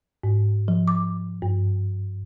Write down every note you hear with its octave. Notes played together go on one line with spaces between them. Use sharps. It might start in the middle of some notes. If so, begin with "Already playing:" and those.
G#2
F3
D6
G2